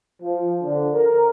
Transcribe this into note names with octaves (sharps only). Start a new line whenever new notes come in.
F3
D3
A#4